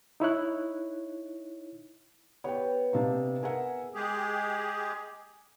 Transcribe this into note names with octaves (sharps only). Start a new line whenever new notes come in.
D#4 E4 C#5 F#6
B3 G4 C#5 G5
C3 D4 D#4 F5 A5
G#4 A#4 E5 F#5
G#3 G4 G#4